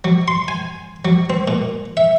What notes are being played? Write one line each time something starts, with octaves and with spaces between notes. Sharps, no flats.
F#3
C6
G#5
F#3
C4
A#2
E5